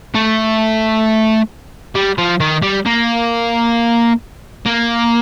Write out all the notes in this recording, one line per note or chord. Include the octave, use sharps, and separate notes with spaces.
A3
G3
F3
D#3
G3
A#3
A#3